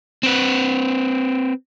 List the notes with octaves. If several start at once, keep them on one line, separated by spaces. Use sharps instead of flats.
C4 B4